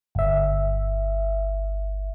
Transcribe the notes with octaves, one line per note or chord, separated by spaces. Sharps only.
G1 E5